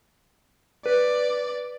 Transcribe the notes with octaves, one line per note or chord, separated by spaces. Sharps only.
B4 D5